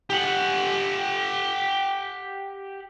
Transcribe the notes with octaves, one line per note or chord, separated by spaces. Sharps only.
G4 F#5